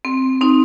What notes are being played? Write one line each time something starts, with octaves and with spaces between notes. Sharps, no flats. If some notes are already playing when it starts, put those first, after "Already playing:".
C4
C4 D#4